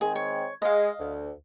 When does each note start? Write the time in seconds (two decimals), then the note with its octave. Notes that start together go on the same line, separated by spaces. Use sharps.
0.01 D#3 G#3 C4 G#4
0.16 C#5
0.62 G#3 D#5 F5
0.99 D2